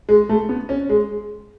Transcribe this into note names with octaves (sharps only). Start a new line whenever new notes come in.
G#3
A3
B3
C#4
G#3